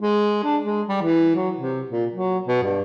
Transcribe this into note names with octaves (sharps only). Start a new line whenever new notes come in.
G#3
D4
G#3
G3
E3
F#3
C3
A#2
F#3
B2
G2